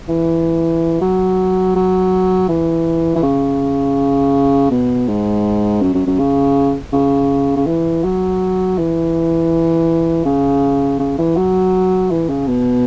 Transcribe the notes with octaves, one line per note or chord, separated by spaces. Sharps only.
E3
F#3
F#3
E3
E3
C#3
B2
G#2
F#2
F#2
F#2
C#3
C#3
C#3
E3
F#3
E3
C#3
C#3
E3
F#3
E3
C#3
B2